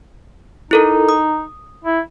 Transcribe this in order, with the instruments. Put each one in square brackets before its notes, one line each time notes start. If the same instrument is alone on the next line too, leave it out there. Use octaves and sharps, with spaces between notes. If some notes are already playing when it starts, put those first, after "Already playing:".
[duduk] D#4 [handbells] E4 A4 A#4
[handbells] D#6
[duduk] E4